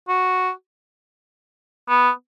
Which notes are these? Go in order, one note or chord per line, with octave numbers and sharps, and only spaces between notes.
F#4
B3